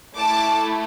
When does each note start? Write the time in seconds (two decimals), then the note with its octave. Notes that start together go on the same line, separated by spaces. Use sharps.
0.16 A3 E4 A4 A5 D6